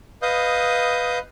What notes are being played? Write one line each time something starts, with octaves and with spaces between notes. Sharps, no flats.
B4 D#5 F5 D#6 G6